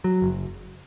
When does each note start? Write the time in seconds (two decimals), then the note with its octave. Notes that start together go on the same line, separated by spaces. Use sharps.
0.04 F#3
0.22 F#1